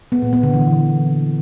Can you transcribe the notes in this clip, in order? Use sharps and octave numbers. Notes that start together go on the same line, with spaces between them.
B3
A#2
B3
D3
E3